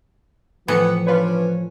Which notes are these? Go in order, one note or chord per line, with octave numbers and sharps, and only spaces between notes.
A2 E3 F3 B3 C#7
C#4 D4 F4 B4 C#5